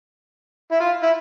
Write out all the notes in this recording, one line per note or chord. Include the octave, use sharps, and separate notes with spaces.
E4
F4
E4